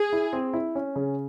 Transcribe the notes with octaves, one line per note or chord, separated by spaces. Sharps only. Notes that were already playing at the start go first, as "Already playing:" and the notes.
Already playing: G#4
E4
C4
E4
C#4
C#3